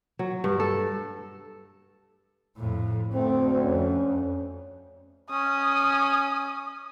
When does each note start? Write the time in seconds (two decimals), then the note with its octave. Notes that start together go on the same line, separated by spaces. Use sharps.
0.19 F#3
0.44 G2
0.60 A4
2.58 F2 A2
3.13 D2 A3 C4
3.64 F2 C#4
5.31 C#4 D#6